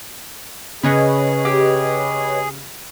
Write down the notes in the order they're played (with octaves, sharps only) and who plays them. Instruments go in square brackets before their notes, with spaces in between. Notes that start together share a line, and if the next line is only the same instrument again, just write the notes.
[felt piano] C#3 [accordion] G#4 [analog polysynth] B4 C#5 D#5
[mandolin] G4